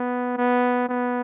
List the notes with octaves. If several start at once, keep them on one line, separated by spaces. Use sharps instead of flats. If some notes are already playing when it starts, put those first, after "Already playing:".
Already playing: B3
B3
B3